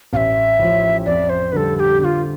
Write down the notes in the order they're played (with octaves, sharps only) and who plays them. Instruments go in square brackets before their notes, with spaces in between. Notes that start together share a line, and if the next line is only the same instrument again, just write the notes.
[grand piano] A1 [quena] F5
[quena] E5
[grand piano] A2 F3
[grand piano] F2 [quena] D5
[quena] C5
[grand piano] D3 G3 [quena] A4 B4
[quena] A4
G4
[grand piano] D3 [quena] G4
[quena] F4